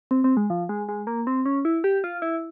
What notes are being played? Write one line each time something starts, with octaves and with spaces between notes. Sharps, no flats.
C4
C4
G#3
F3
G#3
G#3
A#3
C4
C#4
E4
G4
F4
E4